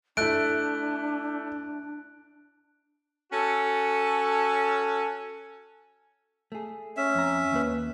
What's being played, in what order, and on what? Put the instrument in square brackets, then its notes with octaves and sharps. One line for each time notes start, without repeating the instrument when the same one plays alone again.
[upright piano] A3 E4 [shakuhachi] D4 [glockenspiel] F#6 D7
[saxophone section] C#4 F#4 A4
[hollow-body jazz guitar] A3 G#4
[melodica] C#4 E5
[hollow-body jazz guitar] F2 A#5
D#2 A#3 B4